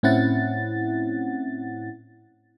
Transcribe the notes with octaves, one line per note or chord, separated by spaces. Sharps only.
A2 C4 C#4 E4 F#5 A6